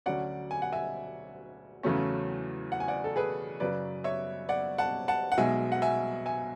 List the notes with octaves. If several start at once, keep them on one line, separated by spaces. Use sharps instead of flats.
D2 D3 F#3 C#4 D5 F#5
G#5
F#5
E5 G#5
E2 C#3 F#3 A3 C#4
F#5
G#5
D5 F#5
A4
G#4 B4
F#2 C#3 F#3 B4 D5
C#5 E5
D5 F#5
F#5 A5
F#5 A5
F#5
B1 B2 G#3 E5 G#5
F#5
E5 G#5
E5 G#5